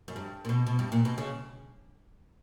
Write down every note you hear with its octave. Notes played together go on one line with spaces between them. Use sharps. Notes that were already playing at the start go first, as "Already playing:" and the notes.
F#2
G2
A#2
B2
B2
G2
A#2
B2
C#3